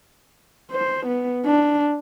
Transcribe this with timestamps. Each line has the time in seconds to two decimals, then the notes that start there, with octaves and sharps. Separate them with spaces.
0.71 C5
1.07 B3
1.45 D4